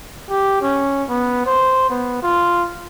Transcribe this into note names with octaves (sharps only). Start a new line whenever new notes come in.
G4
C#4
B3
C5
B3
F4